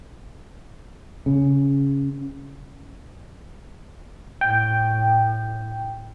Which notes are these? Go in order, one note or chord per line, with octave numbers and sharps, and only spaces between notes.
C#3
A2 G5